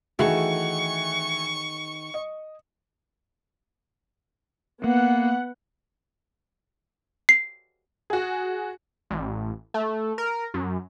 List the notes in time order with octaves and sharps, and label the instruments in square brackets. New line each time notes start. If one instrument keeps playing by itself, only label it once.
[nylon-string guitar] D#3 G#4 A4 [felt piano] E3 A3 F#4 [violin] C#6
[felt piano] D#5
[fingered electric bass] A#3 [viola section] B3 F#5
[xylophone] C7
[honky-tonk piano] F#4 G#4
[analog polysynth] A1
A3
A#4
F#2